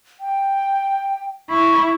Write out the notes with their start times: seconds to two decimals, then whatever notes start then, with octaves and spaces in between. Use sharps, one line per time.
0.20 G5
1.50 E4 C#6